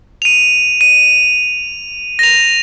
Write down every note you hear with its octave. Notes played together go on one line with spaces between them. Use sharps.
D#7 F7
D#7
A#6 F7